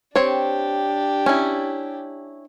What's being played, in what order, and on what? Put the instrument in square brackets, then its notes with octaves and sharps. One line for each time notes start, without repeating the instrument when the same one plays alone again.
[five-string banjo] C4 C#5 [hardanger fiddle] D4 G4
[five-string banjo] C#4 E4